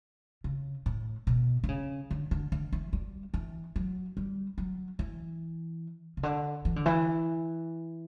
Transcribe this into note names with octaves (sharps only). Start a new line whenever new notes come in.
C#3
A2
B2
D3
C#3
D3
D3
D3
E3
G3
E3
F#3
G3
F#3
E3
C#3
D3
E3
D3
E3